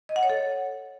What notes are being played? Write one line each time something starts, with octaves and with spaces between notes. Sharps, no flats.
D#5
F#5
C#5
A4